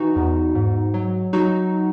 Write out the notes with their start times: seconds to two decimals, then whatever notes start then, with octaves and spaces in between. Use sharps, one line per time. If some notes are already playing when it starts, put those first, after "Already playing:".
Already playing: E3 D#4 F#4
0.16 E2
0.55 G#2
0.94 F#3
1.33 F#3 D#4 F#4